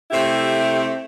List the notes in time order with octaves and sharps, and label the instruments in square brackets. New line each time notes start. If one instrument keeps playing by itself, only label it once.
[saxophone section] C3 A3 C4 E4 G4